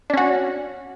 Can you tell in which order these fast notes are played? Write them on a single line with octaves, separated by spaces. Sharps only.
D4 C#4 F#4